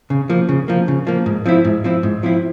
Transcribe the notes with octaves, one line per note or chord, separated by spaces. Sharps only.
C#3
F3 A#3
C#3
F3 A#3
C#3
F3 A#3
G#2
F3 C4 E4
G#2
F3 C4 E4
G#2
F3 C4 E4